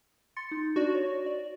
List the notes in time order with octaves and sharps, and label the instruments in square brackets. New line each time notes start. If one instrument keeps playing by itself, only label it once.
[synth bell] C6 A6 C#7
D#4
[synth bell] D4 D5 [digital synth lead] F#4
[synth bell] C#5
D5